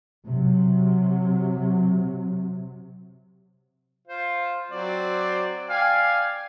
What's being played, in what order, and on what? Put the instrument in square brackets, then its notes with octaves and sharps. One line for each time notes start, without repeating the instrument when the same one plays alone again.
[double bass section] C3 F#3
[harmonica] F4 C5
F#3 C4 D5
[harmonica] D5 G5 G#5 [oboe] F5